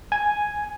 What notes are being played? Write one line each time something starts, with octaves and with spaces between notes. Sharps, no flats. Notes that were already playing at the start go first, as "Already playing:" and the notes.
G#5